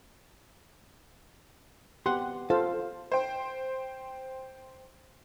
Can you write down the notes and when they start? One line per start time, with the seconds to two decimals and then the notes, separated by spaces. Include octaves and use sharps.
2.06 B3 G4 F#5 C6
2.50 F4 A4 C5 F5
3.12 C5 G5